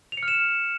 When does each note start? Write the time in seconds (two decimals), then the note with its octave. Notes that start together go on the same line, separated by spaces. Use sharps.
0.12 F7
0.17 C#7
0.23 F6
0.28 E7